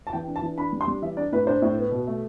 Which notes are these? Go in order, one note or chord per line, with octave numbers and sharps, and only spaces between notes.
A5
E3 G5
D4
A5
E3
D4 B5
G3
C6
G3
E3 E5
D4 D5
A2 B4
D4 C5
A2
B3
B2
A3